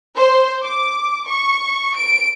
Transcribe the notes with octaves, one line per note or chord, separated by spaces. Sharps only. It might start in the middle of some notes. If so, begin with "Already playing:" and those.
C5
D6
C#6
D7